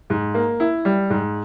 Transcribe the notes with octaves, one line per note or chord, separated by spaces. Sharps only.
G#2
A#3
E4
G3
G#2